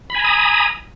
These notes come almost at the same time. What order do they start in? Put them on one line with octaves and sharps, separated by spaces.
B5 G#5 A#5 D#6